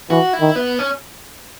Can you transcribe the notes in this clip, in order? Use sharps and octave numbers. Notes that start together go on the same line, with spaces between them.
E3 F#4
E4
D#3
B3
C#4